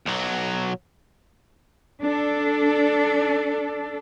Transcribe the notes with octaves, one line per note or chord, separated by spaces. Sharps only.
B1 F#3
D4 A4